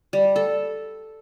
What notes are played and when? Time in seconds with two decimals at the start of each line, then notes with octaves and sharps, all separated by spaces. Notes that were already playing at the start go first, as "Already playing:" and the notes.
0.13 G3
0.36 A4